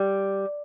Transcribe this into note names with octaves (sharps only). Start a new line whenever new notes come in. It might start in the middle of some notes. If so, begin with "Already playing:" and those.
Already playing: G3